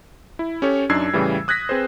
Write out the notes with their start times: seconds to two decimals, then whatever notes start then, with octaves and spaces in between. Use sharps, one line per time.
0.39 E4
0.62 C#4 G4 A4 C#5
0.89 F#2 D4 D#4 E6 G#6 C7
1.13 A2 C#3 E3 G3
1.48 D#6 F#6 G#6 A#6 B6
1.69 C4 G#4 B4 C5